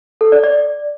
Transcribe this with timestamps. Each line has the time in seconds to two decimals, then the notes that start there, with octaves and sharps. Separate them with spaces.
0.21 A4
0.32 D5
0.43 D5